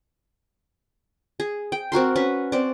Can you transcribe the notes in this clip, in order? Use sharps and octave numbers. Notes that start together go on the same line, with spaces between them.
G#4
G5
C4 F#4 A#4 C6
C#4 F#4 B4
C4 D5